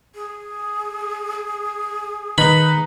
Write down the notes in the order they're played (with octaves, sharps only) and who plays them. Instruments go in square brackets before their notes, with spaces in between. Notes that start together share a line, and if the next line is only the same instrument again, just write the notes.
[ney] G#4
[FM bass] D#3 [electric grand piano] D#4 B4 A#5 [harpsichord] B5